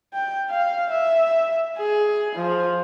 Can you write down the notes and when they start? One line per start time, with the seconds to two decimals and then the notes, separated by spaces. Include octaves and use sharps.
0.14 G5
0.50 F5
0.90 E5
1.77 G#4
2.36 F3